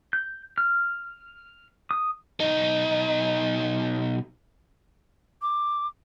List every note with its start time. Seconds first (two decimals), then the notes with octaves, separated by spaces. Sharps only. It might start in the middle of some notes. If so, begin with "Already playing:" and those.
0.13 G6
0.58 F6
1.91 D#6
2.40 B1 D#4
5.42 D6